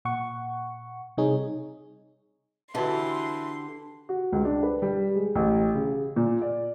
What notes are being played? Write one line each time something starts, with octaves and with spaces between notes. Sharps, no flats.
A#2 F#5 C#6
C3 G3 D#4 G#4 C#5
D3 E3 F#4 G4 B4 D#5 C6
F#4
C#2
D4
B4
G3
G#3
A1
C#3
A#2
D5